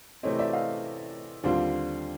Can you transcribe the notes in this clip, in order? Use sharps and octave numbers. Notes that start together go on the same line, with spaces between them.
C3 E3 A3 C4 C#5 D#5
D5 E5
D#5 F5
D#2 D3 G3 C4 F4